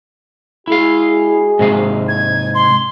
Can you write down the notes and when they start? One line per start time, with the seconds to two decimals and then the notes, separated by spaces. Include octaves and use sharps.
0.68 G#3 E4 F#4 G#4 F5
1.59 G#2 C3 F5
2.08 G#6
2.55 C6